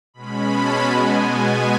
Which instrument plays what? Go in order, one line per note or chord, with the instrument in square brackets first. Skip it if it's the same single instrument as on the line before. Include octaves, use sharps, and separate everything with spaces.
[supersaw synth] B2 G#3 C#4 B5
A5
B2 G#3 B3 G#5
G#5